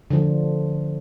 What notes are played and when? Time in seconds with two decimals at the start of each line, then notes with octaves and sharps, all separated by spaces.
0.10 D3 F3